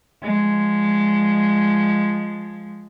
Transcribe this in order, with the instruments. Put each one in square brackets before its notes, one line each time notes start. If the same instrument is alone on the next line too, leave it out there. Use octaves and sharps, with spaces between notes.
[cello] F3 G#3